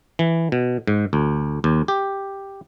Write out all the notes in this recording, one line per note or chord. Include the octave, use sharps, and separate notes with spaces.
E3
B2
G#2
D2
D#2
G4